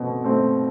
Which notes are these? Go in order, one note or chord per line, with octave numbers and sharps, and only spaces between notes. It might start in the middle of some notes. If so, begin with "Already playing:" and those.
Already playing: B2 A3 C4
A3 C4